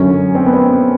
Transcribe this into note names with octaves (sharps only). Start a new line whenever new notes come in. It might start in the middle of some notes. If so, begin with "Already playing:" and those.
Already playing: F#2 D3 F#3 C#4
C4
B3
C4